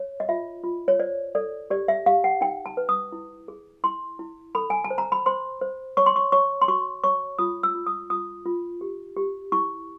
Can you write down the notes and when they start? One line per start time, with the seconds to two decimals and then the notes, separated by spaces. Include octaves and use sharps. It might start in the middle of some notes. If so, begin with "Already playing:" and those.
Already playing: C#5
0.20 D#5
0.29 F4 E5
0.64 F4
0.88 C#5
1.00 C5 D5
1.35 A4 D5
1.70 G4 D5
1.88 E5
2.06 G4 F5
2.24 F#5
2.41 D#4 G5
2.66 A5
2.77 B4
2.89 D#6
3.12 E4
3.48 G#4
3.84 E4 C6
4.19 E4
4.55 A4 B5
4.70 G#5
4.84 A5
4.90 C5
4.98 A#5
5.12 B5
5.26 C5 C6
5.61 C5
5.97 C#5 C#6
6.06 C6
6.16 C#6
6.32 C#5 C#6
6.62 C6
6.68 F#4 C#6
7.04 C#5 C#6
7.39 F4 D#6
7.63 E6
7.75 F4
7.86 D#6
8.10 F4 D#6
8.46 F4
8.81 G4
9.17 G4
9.52 E4 C#6